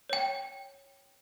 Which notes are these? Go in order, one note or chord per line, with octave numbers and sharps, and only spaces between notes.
C#5 G5